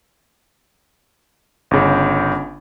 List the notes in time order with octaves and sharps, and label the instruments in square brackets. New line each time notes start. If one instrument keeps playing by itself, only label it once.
[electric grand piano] G1 C#3